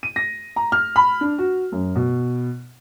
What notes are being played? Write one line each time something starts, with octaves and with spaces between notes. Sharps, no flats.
D#7
A#6
A#5
F6
B5
D4
F#4
F#2
B2